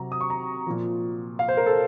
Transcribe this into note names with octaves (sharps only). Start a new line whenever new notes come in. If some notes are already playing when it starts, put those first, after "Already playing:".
Already playing: C3 F#3 A#5
D#6
C#6
A#5
A#2 F3
F5
C5
A#4
A4